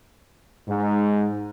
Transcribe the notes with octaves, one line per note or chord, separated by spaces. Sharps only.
G#2